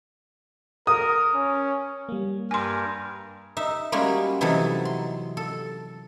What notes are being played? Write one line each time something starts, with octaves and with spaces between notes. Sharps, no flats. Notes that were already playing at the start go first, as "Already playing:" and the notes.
A#4 D#6
C#4
G3 A#3
G2 A#4 G#5 C6
D#4 E5
G3 G#3 A#3 C#4 F#4
C3 E3 F#3 D#4 A4
C6
A4